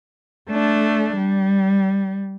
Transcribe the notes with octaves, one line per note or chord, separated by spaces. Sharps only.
A3 D4
G3